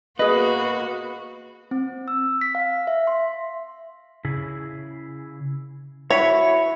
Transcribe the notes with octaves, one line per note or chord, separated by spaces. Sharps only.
A#3 B3 F#4 G#4 B4 D#5
C4
E6
B6
F5
E5
C6
C#3 E4 G#4
E4 F#4 C#5 E5 F#5